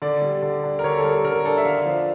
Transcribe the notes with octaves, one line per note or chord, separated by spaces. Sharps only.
D3 D5
G3
D3
D4
A#4
D3 C#5
A4
G3 A#4
D3 A#4
D4 A4
E5
D3 F5
F3